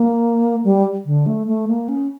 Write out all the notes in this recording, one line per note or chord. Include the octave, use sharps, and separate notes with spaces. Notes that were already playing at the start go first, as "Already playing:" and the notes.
Already playing: A#3
G3
D3
A3
A3
A#3
C#4